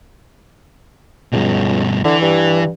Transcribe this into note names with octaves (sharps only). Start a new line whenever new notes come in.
C#2 G2 B2
D3 E3
G2